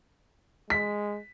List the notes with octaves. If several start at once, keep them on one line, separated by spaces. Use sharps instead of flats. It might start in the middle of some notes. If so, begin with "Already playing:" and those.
G#3 B6